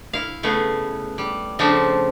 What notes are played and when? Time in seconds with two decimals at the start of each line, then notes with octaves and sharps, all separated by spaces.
0.13 E4 F5
0.43 C#3 A3 B3 G#4
1.18 G3
1.59 C#3 F3 A3 C4 D4